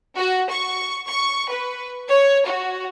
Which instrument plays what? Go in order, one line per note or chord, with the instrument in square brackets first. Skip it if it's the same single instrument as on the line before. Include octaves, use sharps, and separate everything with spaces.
[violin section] F#4
C#6
C#6
B4
C#5
F#4